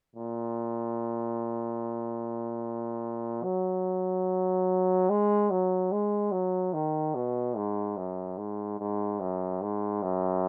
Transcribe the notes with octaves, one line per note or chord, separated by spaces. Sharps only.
A#2
F#3
G#3
F#3
G#3
F#3
D#3
B2
G#2
F#2
G#2
G#2
F#2
G#2
F#2